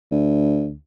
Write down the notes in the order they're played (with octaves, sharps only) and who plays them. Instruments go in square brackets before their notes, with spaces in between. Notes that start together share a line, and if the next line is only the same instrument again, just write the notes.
[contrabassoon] D2